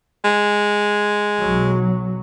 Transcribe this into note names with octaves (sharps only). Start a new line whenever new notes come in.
G#3
B1 F#3